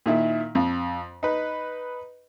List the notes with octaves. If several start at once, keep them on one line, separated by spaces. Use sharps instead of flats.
A#2 D#3 E4
F2
D#4 B4